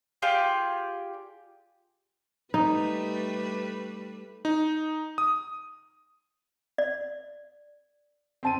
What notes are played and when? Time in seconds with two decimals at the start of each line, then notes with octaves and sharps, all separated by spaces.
0.22 F4 G4 G#4 D5
2.54 G3 A3 D#4 B4
4.45 D#4
5.18 D#6
6.78 D5
8.43 C4 A5 D#7